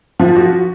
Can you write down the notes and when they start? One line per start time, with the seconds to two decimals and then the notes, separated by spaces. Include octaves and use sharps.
0.20 F3
0.36 F#4